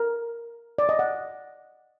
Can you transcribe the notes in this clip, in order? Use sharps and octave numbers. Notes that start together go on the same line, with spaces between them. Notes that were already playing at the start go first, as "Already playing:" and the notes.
Already playing: A#4
D5
D#5
F#5